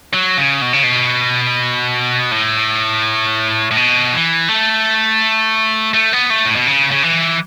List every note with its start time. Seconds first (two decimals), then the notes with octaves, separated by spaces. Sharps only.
0.14 F#3
0.37 C#3
0.62 B2
0.73 C#3
0.83 B2
2.31 A2
3.71 A2
3.77 B2
4.13 E3
4.48 A3
5.94 A3
6.13 B3
6.30 A3
6.45 A2
6.56 B2
6.67 C#3
6.91 C#3
7.03 E3